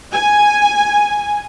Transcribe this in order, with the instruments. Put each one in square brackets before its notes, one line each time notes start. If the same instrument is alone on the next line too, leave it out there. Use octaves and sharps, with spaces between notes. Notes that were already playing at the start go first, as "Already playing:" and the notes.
[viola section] G#5